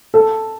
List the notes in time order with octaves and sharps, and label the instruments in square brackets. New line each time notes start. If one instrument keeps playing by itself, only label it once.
[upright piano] A4